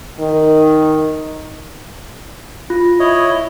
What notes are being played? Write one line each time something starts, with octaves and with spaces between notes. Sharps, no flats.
D#3
F4
E4 C#5 D#5